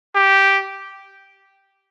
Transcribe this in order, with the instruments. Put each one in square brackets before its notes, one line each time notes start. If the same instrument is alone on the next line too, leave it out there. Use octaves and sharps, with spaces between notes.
[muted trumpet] G4